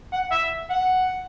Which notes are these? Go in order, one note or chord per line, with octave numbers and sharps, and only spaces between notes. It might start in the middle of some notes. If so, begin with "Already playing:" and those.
F#5
E5
F#5